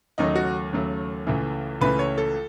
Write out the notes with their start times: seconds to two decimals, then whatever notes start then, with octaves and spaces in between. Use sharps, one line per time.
0.18 D#2 C#3 F#3 A3 D#4
0.35 F#4
0.73 D#2 C#3 F#3 A3
1.27 C#2 C#3 E3 A3
1.81 C#2 C#3 E3 A3 B4
1.99 C#5
2.18 A4